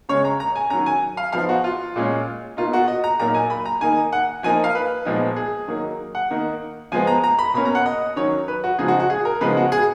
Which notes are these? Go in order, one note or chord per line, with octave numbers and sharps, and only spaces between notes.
C#3 G#3 C#4 C#5
A#5
A#5
G#5
D#3 F#3 C#4 A#5
G#5
F5
F3 B3 D#4 F5
F#4
F4
A#2 G#3 C#4
B2 A#3 D#4 F4
F#4
D#5
A#5
A#2 F#3 A#3 D#4 A#5
G#5
B5
A#5
D#3 A#3 D#4 G#5
F#5
F3 A#3 D#4 G#5
F5
B4
A#2 F3 G#3 B3 D#4
G#4
D#3 F#3 A#3 D#4
F#5
D#3 A#3 D#4
F3 G#3 B3 G#5
A#5
A#5
B5
B2 A#3 C#4 B5
A#5
F#5
D#5
D#3 F#3 C#4 C#5
B4
F#4
C#3 F3 G#3 D#4 G#4
F#4
F#4
G#4
A#4
C#3 F3 G#3 B3 D#4 B4
F#4
G#4